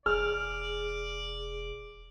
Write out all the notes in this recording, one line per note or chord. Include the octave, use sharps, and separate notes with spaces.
E1 G#4 D5 F6